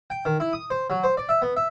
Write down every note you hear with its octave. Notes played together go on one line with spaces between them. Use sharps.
G5
D#3
E4
D#6
C5
F#3
C5
D5
E5
B3
E5